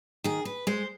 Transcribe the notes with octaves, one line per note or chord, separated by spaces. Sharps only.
D#3 G#4
B4
G#3 C5